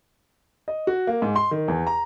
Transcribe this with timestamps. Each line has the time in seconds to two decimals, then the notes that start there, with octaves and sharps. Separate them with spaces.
0.68 D#5
0.87 F#4
1.07 A#3
1.22 G#2
1.36 C6
1.51 D#3
1.68 E2
1.87 A#5